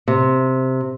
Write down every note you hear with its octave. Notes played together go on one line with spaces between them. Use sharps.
C3